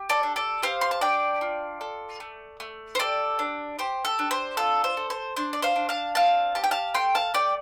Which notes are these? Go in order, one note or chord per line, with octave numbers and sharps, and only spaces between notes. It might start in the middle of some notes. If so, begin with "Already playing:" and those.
Already playing: G4
A4 D5
D4
A4 D5
G4 C5 F5
C6
A5
D4 D5 G5
F4
A4
A3
A3
C5
G4 A4 D5
D4
G4 C5
A4
D4
C5
F4 A4
C5
A4
C5
D4 C5
D5
C5 F5
D4
F5 A5
C4 F5 A5
G4 A5
G5
F5 A5
A3 G5 C6
F5 A5
A3 D5 G5